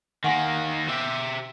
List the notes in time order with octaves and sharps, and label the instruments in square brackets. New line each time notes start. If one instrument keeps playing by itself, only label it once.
[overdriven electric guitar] D#3 A#3 [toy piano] F#5 G#5 C6
[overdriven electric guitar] G4 E5